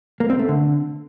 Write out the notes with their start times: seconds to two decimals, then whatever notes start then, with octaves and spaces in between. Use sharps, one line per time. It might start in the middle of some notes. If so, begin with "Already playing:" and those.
0.20 A#3
0.30 C4
0.39 A3
0.49 D3